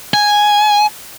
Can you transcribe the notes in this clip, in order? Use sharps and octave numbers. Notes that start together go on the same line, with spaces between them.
G#5